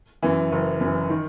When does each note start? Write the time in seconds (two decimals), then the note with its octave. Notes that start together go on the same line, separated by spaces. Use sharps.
0.23 F#2 E3
0.52 F#1
0.81 F#2 E3
1.10 D#3